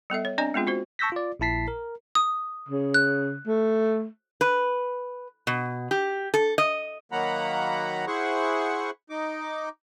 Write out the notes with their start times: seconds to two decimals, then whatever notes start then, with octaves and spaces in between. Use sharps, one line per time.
0.10 G3 B3 A4 E5
0.25 C#5
0.38 C4 D4 D5 D#5 G#5 A#5
0.54 G#3 B3 C4 F4 G#4
0.67 F4 F#4 C5
0.99 A5 C#6 E6 G6 A#6 B6
1.12 F4 D5
1.40 A#1 A#2 E4 A5 B6 C7
1.68 A#4
2.15 D#6
2.69 C#3
2.94 F#6
3.47 A3
4.41 B4
5.47 B2
5.91 G4
6.34 A4
6.58 D#5
7.12 D#3 F#3 A#3 F#5 A#5 B5
8.07 E4 G#4 C5 F#5 C#6
9.10 D#4 D6